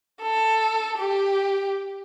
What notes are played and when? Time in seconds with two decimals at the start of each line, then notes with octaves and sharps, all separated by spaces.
0.22 A4
0.98 G4